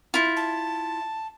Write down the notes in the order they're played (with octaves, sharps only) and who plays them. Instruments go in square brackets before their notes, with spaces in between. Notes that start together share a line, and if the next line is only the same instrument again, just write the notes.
[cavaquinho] E4 F4
[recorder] A5